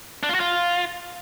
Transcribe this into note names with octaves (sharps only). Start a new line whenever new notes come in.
D4
F4
F#4
F4